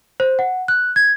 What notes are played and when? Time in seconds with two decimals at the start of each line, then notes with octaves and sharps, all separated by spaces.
0.20 C5
0.39 F#5
0.68 F#6
0.96 G#6